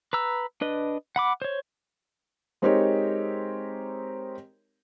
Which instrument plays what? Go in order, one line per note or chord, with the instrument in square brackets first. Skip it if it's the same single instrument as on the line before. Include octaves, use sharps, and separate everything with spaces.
[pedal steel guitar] B4 A#5 E6
D4 B4 D#5
F#5 B5 D6
C5 C#5
[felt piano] G#3 C4 D#4 G4 A#4 C#5